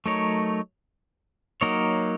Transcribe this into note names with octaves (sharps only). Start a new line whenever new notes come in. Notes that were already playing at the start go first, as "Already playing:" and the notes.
F#3 A3 D#4 A#4 C#5
F#3 A#3 D#4 A#4 C#5